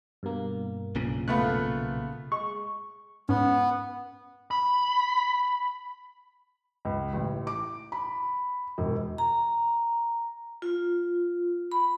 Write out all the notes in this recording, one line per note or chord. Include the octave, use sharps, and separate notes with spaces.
G2 B2 A#3
B1 A#2 C#3
A3 B3 F4 F#6
G#3 C#6
G#2 B3 C#4
B5
C#2
A1
D6
B5
E1
A#5
F4
B5